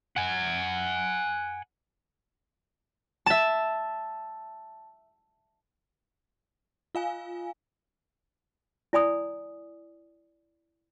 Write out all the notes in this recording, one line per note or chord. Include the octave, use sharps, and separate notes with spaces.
F#5 G#5
E5 A5
F4 F5 G#5
E4 D5 G#5 B5 D#6